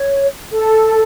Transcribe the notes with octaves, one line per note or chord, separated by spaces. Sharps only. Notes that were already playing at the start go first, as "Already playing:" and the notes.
Already playing: C#5
A4